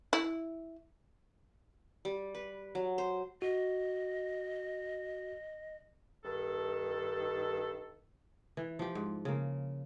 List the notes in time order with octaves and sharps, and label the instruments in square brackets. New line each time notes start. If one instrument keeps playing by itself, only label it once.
[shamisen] E4
[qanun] G3
B4
F#3
C5
[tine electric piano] F#4 [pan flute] D#5
[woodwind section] G2 D#3 A4
[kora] E3
F3 G4
G#2
C#3 A#3